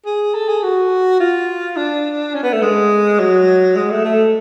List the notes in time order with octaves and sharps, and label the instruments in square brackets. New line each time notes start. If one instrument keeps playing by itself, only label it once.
[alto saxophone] G#4
A4
G#4
F#4
F4
D4
C#4
B3
A3
G#3
F#3
G#3
A3
A3